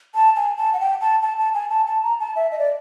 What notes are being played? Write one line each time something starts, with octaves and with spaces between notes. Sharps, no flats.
A5
G#5
A5
F#5
G5
A5
A5
A5
G#5
A5
A5
A#5
A5
E5
D#5
D5